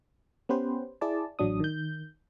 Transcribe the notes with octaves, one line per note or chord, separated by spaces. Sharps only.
B3 C#4 G4 B4 C5
E4 G#4 D5 A5
A1 F#3 D4 D#6
D#3 G6